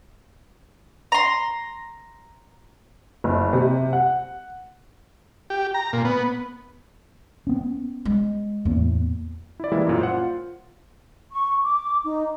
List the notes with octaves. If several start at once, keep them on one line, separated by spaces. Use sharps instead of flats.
A#5 C6
F#1
C3
F#5
G4
A#5
A#2
B3
B3 C#4
G#3
E2 A2 A#3 B3
E4 D5
E3 G3 G#3 A#3 E4
F#2 A#2
C5 F#5
F4
C#6
D6
D#4